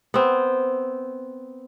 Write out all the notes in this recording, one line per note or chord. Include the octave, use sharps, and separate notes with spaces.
B3 C4